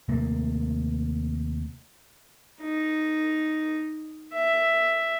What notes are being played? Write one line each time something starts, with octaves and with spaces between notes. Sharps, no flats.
D#2 C3 A3 A#3
D#4
E5